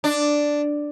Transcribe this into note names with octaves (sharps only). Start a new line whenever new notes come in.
D4